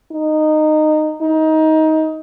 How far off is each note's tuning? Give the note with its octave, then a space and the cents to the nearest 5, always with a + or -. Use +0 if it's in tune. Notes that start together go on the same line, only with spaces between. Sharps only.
D#4 -15
D#4 +20